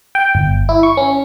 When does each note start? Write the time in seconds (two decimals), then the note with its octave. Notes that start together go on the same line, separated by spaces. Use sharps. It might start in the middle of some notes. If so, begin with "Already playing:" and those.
0.15 G5
0.35 G1
0.69 E4
0.83 C#6
0.97 C#4